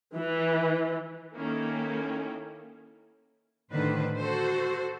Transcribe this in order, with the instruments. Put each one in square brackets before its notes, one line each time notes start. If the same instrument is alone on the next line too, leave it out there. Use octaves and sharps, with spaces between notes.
[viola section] E3
D#3 A#3 C#4 E4 A4 G5
[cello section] A2 D3 D#3 B4 C5
F#4 A4 C5